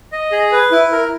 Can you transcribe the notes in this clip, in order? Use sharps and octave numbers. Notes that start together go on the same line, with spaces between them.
D#5
G#4
B4
E4
A#4